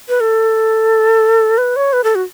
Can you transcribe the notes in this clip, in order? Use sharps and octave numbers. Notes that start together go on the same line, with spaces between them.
B4
A4
B4
C#5
B4
A4
F#4